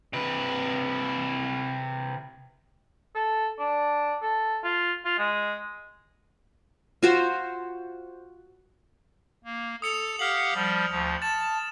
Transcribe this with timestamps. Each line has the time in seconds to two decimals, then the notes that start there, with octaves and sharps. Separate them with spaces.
0.13 C3 B4
3.15 A4
3.59 D4
4.22 A4
4.64 F4
5.05 F4
5.18 G#3
7.03 F4 F#4 C5
9.44 A#3
9.82 A4 D#6 C#7 F7
10.19 G4 F5 F#5 F6 F#7
10.54 F3 G3
10.89 D2 F3
11.22 A5 A6 E7